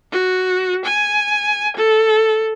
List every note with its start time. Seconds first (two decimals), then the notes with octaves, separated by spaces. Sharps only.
0.11 F#4
0.85 G#5
1.76 A4